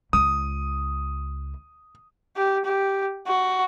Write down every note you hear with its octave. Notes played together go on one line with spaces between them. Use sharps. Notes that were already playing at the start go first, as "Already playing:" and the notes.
C#2 D#6
G4
G4
F#4